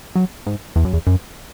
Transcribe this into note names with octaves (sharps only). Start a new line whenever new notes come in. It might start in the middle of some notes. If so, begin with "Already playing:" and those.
F#3
G#2
E2
F#2
E2
F#2